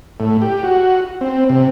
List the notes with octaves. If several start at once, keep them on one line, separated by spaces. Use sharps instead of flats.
A2
G4
F#4
C4
C3